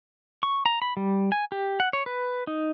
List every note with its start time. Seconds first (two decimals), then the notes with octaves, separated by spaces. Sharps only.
0.43 C#6
0.66 A#5
0.82 B5
0.97 G3
1.32 G#5
1.52 G4
1.80 F#5
1.93 C#5
2.06 B4
2.47 D#4